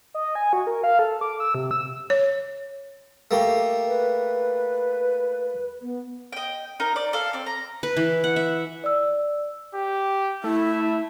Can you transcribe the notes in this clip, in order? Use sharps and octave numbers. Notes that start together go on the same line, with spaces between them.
D#5
G#5
F#4
A#4
F5
A4
D6
E6
C3
E6
C#5
A3 A#3 G4
B4
B3
D#5 G5
D#4 A#4
D5
A4 F5
C4 D5
A#5
B4
E3
F#5
E5
D5 E6
G4
A3 E4 E5